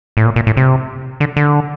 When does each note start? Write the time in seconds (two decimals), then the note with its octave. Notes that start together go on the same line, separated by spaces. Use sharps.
0.17 A2
0.25 A#2
0.36 A#2
0.47 A2
0.57 C3
1.20 D3
1.37 D3